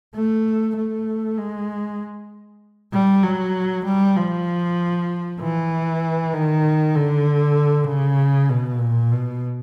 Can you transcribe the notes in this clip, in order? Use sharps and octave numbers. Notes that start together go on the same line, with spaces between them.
A3
A3
G#3
G3
F#3
G3
F3
E3
D#3
D3
C#3
B2
A#2
B2